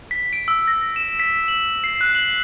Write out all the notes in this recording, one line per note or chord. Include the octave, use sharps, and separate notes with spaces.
B6
D7
E6
A#6
E7
B6
F#7
C7
F#6
F#7